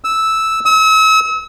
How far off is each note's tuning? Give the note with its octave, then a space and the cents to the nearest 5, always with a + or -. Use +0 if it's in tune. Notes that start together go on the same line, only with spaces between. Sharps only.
E6 -10
E6 -40